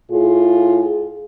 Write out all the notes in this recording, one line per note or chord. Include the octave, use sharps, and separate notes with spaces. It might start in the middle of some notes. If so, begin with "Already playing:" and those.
A2 F4 G#4